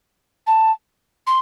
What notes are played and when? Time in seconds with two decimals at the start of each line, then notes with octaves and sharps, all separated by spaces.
0.46 A5
1.26 C6